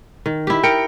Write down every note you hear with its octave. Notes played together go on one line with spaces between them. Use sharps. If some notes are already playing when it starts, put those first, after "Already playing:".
D#3
E4 G4
A#4 G5 C#7 D7